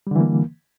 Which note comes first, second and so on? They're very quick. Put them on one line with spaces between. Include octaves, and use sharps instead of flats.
G3 D3 E3 A#3